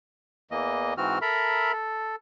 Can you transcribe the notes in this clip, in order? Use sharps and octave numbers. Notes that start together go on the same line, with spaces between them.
E2 E3 A#3 D#5
G#2 E3 C4 F#4 F6
A4 A#4 E5 A#5 B5
A4